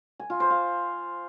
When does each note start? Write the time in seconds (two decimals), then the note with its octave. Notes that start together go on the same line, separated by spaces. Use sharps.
0.19 G#5
0.30 F4
0.40 C5
0.50 F5